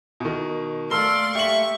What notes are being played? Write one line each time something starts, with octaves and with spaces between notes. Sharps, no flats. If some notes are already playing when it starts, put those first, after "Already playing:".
B2 D#3
A3 A#3 A4 D5 C6 F6 G7
G4 E5 C#6 F#7